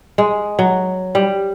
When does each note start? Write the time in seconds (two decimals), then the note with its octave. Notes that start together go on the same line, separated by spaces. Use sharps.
0.18 G#3
0.59 F#3
1.15 G3